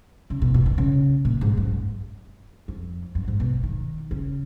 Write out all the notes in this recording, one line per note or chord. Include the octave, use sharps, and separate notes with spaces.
C#3
B2
B2
D#3
C#3
A#2
G#2
F#2
F2
F#2
G#2
B2
D#3
C#3